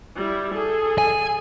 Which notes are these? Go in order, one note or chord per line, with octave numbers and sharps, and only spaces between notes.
G3 E4
G#4 A4
G#5